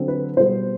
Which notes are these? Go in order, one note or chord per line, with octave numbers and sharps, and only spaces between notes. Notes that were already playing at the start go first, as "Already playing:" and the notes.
Already playing: D3 F#3 C4
B4
B2 G3 B3 C5